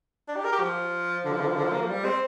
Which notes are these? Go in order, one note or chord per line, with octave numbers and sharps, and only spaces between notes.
D4
G4
A#4
G4
F3
D3
F3
D3
F3
D3
F3
A#3
F3
G3
C4